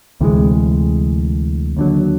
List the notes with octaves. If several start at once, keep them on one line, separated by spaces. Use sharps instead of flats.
D2 C3 E3 G#3
D#2 D3 F#3